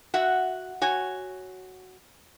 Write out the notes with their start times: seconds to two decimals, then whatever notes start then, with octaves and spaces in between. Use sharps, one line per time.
0.14 F#4 E5 F#5
0.81 F#4 C#5 G#5